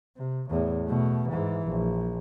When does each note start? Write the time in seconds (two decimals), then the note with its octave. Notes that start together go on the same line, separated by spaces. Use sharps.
0.17 C3
0.50 E2 A2
0.85 B2 A3
1.29 G#2 E3
1.69 A#1